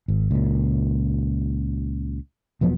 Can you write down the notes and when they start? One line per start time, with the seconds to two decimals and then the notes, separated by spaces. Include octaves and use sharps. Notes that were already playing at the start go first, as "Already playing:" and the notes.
0.08 G#1
0.31 C#2 A#2
2.61 E1 F3 F#3 B3